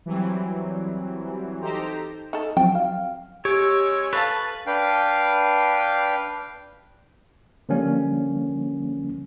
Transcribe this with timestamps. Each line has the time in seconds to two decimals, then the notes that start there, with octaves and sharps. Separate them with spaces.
0.06 E3 F#3 G3 C4
1.61 D#4 G4 A4 C5 A#5
2.33 D#4 A4
2.57 F3 F#3 C4 G5
2.75 F5
3.45 G#3 C#4 G4 C#5 E6
4.13 A4 B4 F5 A5 C#6
4.67 D4 B4 F5 G5
7.69 D3 F3 G3 A#3 C#4